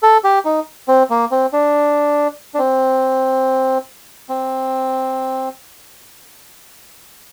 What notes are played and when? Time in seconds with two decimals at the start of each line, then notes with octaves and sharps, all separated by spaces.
0.03 A4
0.24 G4
0.45 D#4
0.88 C4
1.10 A#3
1.31 C4
1.53 D4
2.54 D4
2.58 C4
4.29 C4